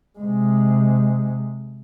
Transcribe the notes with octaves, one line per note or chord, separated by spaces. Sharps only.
C3 G#3